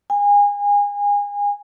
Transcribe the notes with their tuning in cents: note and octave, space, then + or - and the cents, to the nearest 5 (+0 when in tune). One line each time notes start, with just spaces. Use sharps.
G#5 -30